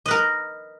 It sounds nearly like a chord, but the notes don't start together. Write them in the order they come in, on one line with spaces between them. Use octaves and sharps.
D#5 B4 A#4